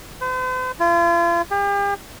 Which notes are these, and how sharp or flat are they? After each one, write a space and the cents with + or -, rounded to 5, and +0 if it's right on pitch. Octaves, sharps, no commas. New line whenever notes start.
C5 -45
F4 -40
G4 +40